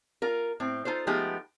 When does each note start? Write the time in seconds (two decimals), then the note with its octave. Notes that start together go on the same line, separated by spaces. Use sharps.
0.22 F4 A#4
0.60 A2 C4
0.85 D#4 F4 A4 C5
1.07 F3 G#3 A3 B3 D#4 G4